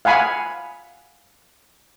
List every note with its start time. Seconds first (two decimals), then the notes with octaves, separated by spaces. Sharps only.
0.05 F5 F#5 G#5 B5